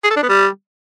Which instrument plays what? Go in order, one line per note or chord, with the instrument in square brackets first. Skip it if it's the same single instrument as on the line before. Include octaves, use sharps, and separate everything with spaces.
[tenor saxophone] G#4
A4
D4
B3
G3